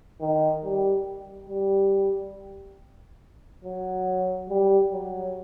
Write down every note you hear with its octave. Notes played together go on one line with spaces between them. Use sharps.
D#3
G3
G3
F#3
G3
F#3